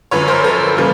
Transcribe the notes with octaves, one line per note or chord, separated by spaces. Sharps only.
F#2 D3 F3 B4 C#5
A#4 C5
A4 B4
C#3 E3 G3 A#3